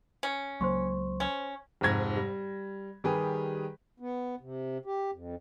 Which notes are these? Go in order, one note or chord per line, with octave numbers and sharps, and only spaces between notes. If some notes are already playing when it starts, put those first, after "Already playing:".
C#4
C#2 F#3 A#3 C5 C6 C#6
C#4
F1 F2 G#2 G#6 A#6
G3
D#3 G3 G4 G#4 B4
B3
C3
G4
F2